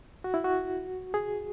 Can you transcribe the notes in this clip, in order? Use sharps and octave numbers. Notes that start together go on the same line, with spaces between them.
F#4
E4
F#4
G#4